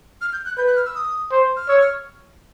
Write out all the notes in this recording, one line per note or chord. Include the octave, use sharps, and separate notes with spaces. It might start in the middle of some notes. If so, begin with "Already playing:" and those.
F6
G6
F#6
B4 G6
F#6
F6
E6
D#6
C5
F6
C#5 E6
F6